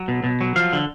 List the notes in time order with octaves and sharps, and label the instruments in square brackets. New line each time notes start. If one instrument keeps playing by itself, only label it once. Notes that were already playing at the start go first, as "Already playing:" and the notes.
Already playing: [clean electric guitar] F#3
B2
B2
F#3
F3 F5
D3